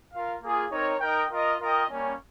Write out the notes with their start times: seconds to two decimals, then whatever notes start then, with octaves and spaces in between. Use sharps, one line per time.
0.12 F4 A#4 F5
0.41 A#3 F4 G#4
0.71 C4 D#4 A#4 C#5
1.01 D#4 A#4 D#5 G5
1.31 F4 A#4 D#5
1.60 F4 A#4 D#5 G5
1.90 G3 A#3 C#4